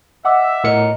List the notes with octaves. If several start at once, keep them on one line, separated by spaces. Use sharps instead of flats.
D#5 E5 F#5 D6 E6
A2 A#4 C#5 D#5 A#5 C#7